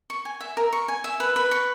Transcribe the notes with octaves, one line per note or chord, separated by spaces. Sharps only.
C#6
G#5
E5
A#4
C#6
G#5
E5
B4
B4
C#6